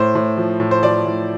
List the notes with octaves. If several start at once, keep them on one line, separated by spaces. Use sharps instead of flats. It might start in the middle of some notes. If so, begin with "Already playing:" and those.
Already playing: A2 C5
A2
F3
A2
C5
F3 D5
A2